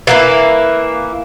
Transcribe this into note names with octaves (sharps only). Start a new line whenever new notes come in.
E3 A#3 E4